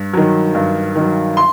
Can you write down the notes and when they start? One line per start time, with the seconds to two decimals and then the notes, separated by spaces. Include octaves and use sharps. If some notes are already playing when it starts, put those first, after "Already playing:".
Already playing: G2
0.13 D#3 F#3
0.55 G2
0.95 D#3 F#3
1.37 C6